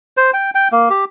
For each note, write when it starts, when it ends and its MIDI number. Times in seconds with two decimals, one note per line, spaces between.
0.17 0.31 72
0.34 0.50 79
0.55 0.68 79
0.72 0.89 58
0.90 1.05 67